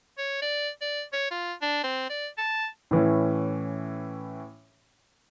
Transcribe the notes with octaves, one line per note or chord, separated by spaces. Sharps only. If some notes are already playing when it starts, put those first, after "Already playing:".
C#5
D5
D5
C#5
F4
D4
C4
D5
A5
A2 E3 C#4